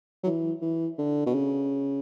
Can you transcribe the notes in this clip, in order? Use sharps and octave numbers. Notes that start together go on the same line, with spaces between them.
F#3
E3
E3
D3
B2
C#3